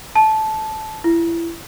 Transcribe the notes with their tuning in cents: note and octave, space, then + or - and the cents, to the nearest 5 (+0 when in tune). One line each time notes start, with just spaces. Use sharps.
A5 -15
E4 +25